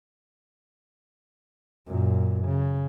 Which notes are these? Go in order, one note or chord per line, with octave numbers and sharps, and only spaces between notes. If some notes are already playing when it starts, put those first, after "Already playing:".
F#2 A#2
C#3